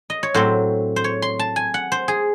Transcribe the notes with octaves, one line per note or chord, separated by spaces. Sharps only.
D#5
C#5
A2 F#3 C4 C5
C5
C#5
C6
A5
G#5
F#5
C5
G#4